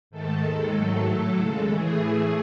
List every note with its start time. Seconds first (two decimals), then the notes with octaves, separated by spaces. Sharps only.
0.10 G#2 D#3 A3 A4
0.43 D#2 D#3 G#3
0.74 G#2 D#3 F#3 A3 A4
1.05 A2 F#3 A3
1.37 D#2 C#3 G#3 A4
1.69 A2 E3 A3 G#4
2.00 A2 E3 A3